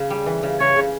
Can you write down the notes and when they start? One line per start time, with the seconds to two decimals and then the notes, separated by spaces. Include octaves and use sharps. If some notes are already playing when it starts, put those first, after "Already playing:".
Already playing: C#3
0.10 G3
0.26 E3
0.43 C#3
0.59 C#3 C#5
0.76 C#3